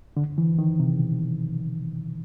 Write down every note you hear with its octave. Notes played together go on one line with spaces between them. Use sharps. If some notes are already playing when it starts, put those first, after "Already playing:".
D3
E3
D#3
C3
B2